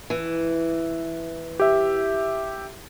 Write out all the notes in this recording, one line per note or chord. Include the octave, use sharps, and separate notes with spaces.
E3
G4 E5